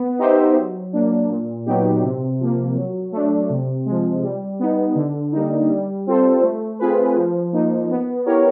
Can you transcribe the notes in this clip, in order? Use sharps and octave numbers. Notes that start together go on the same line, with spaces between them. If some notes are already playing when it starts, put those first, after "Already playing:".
Already playing: B3
D#4 G4 C5 E5
F#3
A#3 D4
A#2
F#3 B3 D#4 G4
C3
F3 A#3
F#3
A3 D4
C3
F3 G#3
G3
B3 D#4
D3
G3 A#3 D#4
G3
C4 F4 A4 C5
A3
C4 F4 G#4 B4
F3
A#3 D#4
B3
E4 G4 A#4 C#5